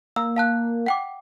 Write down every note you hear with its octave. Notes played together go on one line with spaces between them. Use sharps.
A#3 E6
F5 A5 F#6
F#5 G5 D6